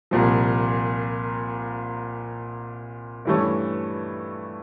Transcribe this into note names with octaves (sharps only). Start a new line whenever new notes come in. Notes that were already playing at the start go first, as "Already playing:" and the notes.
C2 A#2 F3
G2 E3 A3 C#4